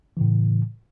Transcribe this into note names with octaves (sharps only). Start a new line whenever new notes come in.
A2 C#3 E3